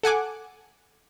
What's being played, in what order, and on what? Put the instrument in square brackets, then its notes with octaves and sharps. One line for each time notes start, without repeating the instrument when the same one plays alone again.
[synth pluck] A4 F#5 G#5 D6